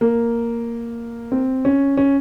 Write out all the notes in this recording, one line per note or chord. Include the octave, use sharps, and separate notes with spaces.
A#3
C4
C#4
C#4